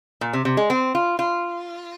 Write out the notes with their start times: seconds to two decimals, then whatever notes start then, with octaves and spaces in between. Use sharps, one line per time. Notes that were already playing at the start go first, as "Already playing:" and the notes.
0.21 A#2
0.33 C3
0.45 C3
0.57 G#3
0.70 C4
0.95 F4
1.19 F4